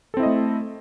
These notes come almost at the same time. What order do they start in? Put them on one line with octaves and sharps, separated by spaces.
A4 C4 E4 D#5 A3